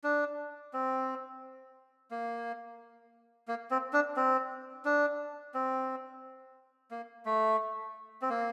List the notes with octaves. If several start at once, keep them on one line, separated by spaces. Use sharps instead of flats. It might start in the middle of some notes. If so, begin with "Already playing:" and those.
D4
C4
A#3
A#3
C4
D4
C4
D4
C4
A#3
A3
C4
A#3